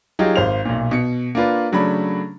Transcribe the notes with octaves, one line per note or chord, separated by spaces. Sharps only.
F#3 D#4 F4 G4 G#4
G#1 C5 F5 F7
B1 A#2
B2 C#7
A#3 D4 F4 B4
C#3 F#3 A3 D4 B5